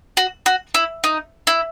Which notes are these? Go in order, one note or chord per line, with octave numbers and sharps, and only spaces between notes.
F#4
F#4
E4
D#4
E4